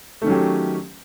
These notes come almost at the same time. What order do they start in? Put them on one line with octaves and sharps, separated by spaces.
A3 D#3 C#4 F#3 G4